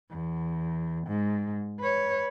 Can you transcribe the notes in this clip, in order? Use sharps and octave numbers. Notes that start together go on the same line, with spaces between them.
E2
G#2
B4 C#5